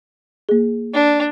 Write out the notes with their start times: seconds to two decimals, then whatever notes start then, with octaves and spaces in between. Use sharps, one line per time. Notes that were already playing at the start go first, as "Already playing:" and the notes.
0.49 A#3 G#4
0.94 D4